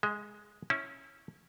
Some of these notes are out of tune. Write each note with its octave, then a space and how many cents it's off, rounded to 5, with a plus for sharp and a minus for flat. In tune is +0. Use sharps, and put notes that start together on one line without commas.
G#3 +0 D#5 +35
C#4 -10 E4 -20